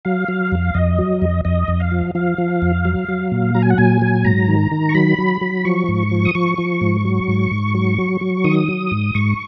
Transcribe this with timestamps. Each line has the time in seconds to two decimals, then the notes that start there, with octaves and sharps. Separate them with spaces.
0.05 F#3 F5
0.28 F#3
0.52 F2
0.74 F2 D#5
0.98 F#3
1.22 F2
1.45 F2 D#5
1.68 F2
1.80 F5
1.91 F3
2.15 F3 F5
2.38 F3
2.62 F2
2.85 F#3
3.08 F#3
3.32 A#2
3.54 F#3 A#5
3.62 G#5
3.70 F#5
3.78 A#2 G#5
4.02 F#3
4.24 G#2 A#5
4.48 D#3
4.71 D#3
4.89 C#6
4.95 F#3 B5
5.18 F#3
5.41 F#3
5.65 F3 C#6
5.88 G#2
6.11 F3
6.25 D#6
6.35 F3 C#6
6.58 F3
6.81 G#2
7.05 F#3
7.28 G#2
7.51 G#2
7.74 F#3
7.98 F#3
8.21 F#3
8.44 D#3 D#6
8.68 F#3
8.91 G#2
9.15 G#2 C#6